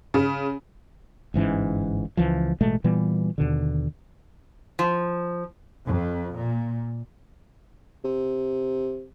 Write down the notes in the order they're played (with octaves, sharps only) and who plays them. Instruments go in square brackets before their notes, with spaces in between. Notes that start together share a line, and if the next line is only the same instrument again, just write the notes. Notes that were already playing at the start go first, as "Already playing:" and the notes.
[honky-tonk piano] C#3
[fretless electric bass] G1 G#2 E3 C#4
C#2 E3 F3
A1 B2 G#3 A3
A#2 E3 G3 B3
D#2 B2 D3
[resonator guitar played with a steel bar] F3
[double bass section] F2
A#2
[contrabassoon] C3